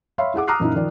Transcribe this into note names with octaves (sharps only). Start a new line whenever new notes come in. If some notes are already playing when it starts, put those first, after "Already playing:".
C#5 E5 F5 B5 C6
E4 G#4 F#5 D6
A#5 D6 D#6 F6 F#6 C7
F#2 A#2 D#4 E4
D#3 F3 D5